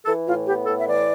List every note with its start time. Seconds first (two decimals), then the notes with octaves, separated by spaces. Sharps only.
0.05 E3 A4
0.26 A2 F4
0.46 B3 G4
0.66 A2 A4
0.79 E5
0.87 E3 D5